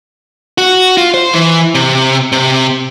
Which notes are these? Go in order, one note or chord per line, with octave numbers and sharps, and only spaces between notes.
F#4
F4
C5
E3
C3
C3